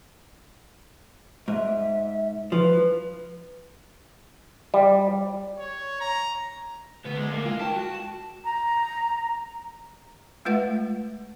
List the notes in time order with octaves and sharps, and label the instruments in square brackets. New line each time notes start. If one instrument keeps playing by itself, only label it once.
[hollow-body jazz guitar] G#2 [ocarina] E5
[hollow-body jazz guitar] F3 [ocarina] B4
[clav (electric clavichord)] G3
[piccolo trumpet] C#5
A#5
[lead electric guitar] D2 [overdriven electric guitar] B3
[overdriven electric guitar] G#3
A#3
[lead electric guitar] G#3 [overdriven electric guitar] F4
[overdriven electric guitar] A#4 G5 [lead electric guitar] A5
[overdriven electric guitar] F#4
[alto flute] A#5
[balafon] G#3 A3 F4 B4 E5 F#5